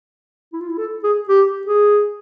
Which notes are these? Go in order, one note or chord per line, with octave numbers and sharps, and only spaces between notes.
E4
F4
E4
A4
G#4
G4
G#4